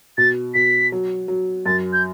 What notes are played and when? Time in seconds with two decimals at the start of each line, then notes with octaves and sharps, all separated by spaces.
0.18 B2 A6
0.54 B2 B6
0.92 F#3
1.28 F#3
1.66 F#2 A6
1.93 G6